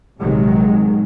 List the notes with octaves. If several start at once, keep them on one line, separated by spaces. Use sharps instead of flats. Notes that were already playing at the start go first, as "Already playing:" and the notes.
A#1 C3 D#3 F#3 G#3